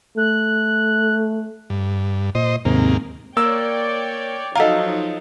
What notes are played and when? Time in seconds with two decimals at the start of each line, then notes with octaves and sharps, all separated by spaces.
0.17 A3 F#6
1.70 G2
2.35 A#2 C5 D#5
2.65 D#2 G#2 C3 A#3
3.37 A#3 C#5 D5 G5 E6
4.56 F3 F#3 D#4 A4 D#5 F5 F#5 A#5